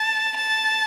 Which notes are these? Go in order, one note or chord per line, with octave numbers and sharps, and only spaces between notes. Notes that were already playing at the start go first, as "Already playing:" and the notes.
Already playing: A5
A5